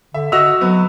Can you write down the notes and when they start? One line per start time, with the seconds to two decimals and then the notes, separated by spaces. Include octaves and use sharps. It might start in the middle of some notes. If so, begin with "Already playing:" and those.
0.14 D3 E5
0.32 D3 F#4 D#5 E6 A#6 F7
0.61 F#3 B3